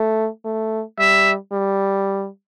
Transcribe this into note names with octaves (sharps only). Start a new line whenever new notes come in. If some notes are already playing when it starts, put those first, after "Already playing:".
Already playing: A3
A3
G3 E5
G3